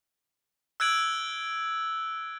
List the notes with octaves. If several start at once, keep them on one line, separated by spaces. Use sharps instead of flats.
E6 F#6 G#6 D7 F#7